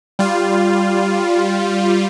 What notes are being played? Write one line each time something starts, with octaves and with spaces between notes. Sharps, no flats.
G3 F4